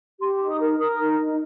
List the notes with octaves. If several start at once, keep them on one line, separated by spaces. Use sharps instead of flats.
G4 C6
D#4
D#6
A#4
A#4 D#6
D#4
D#4